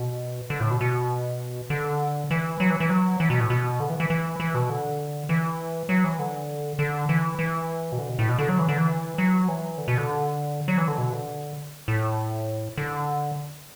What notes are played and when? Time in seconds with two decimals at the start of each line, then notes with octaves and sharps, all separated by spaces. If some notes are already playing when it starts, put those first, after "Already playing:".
Already playing: B2
0.50 D3
0.60 A2
0.70 B2
0.81 B2
1.70 D3
2.31 E3
2.60 F#3
2.70 E3
2.80 E3
2.90 F#3
3.20 E3
3.30 B2
3.40 A2
3.50 B2
3.80 D3
3.90 E3
4.00 E3
4.10 E3
4.40 E3
4.55 B2
4.70 D3
5.29 E3
5.89 F#3
6.04 E3
6.19 D3
6.79 D3
7.09 E3
7.39 E3
7.92 B2
7.98 D3
8.09 B2
8.19 A2
8.29 B2
8.39 D3
8.49 F#3
8.59 E3
8.69 D3
8.78 E3
9.18 F#3
9.48 E3
9.78 D3
9.88 B2
9.98 D3
10.68 F#3
10.78 E3
10.88 D3
10.98 B2
11.12 D3
11.88 A2
12.78 D3